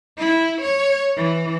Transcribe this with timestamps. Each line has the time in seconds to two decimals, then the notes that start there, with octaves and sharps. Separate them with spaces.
0.18 E4
0.62 C#5
1.16 E3